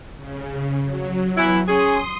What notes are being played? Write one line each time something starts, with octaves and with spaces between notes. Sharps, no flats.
C#3
F#3
E3 B3 E4
C#4 G#4 C6 D#6